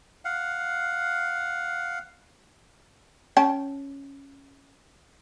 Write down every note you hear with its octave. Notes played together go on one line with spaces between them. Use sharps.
F5 F#5
C#4 G5 A5